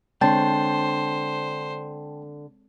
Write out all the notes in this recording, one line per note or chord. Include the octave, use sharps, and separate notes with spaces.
D3 G#3 C4 C5 C#5 G5 A5